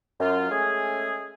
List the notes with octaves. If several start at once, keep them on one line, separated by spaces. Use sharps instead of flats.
F#2 F4
G#3 A3 C#4 G#4